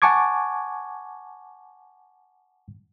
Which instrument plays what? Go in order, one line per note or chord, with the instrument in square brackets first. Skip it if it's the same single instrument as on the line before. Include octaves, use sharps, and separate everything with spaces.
[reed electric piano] F#5 G#5 A5 C#6 D6 G#6